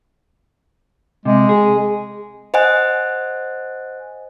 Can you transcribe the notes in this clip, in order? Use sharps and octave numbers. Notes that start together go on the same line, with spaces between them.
C3 G#3
G#4
C5 D#5 F#5 G#5 F#6